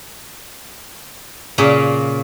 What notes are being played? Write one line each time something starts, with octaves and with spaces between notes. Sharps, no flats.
A#2 C#3 A#3 C#4